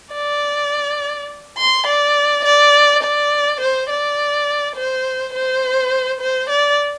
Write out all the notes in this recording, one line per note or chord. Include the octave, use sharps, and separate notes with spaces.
D5
C6
D5
D5
D5
C5
D5
C5
C5
C5
D5